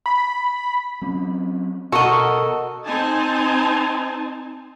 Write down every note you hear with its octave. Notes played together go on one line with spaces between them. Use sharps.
B5
F#3 C4 C#4
B2 F#4 A4 A#4 D#5 F#5 C#6
C4 D#4 G#5 A5